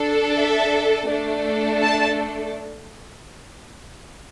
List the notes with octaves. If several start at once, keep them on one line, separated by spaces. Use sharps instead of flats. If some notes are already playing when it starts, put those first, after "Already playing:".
Already playing: D4 A4
E5
A3 D4 A4
A5